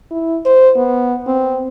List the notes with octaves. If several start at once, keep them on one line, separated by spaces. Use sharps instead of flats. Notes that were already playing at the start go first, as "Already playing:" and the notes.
E4
C5
B3
C4